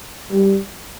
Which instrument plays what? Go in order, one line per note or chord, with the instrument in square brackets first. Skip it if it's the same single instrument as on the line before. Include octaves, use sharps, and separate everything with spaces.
[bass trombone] G3